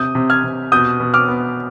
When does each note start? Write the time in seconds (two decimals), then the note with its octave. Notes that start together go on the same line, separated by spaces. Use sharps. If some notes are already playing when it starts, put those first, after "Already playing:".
Already playing: C3 D#6 G6
0.15 C3
0.30 F6 G#6
0.44 C3
0.72 B2 D#6 G6
1.00 B2
1.14 D6 F6
1.28 B3